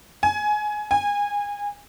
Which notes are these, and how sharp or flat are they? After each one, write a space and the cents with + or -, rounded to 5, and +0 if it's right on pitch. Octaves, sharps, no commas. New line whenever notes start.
G#5 +15
G#5 -25